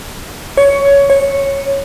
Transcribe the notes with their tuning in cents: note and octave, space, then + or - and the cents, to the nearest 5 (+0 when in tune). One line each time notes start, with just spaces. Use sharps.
C#5 +15
C#5 -5